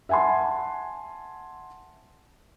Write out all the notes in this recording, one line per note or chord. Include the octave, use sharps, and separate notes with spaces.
E5 F#5 G#5 A5 C6